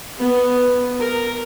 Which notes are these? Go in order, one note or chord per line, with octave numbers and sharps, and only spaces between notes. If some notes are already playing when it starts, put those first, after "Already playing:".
B3
A#4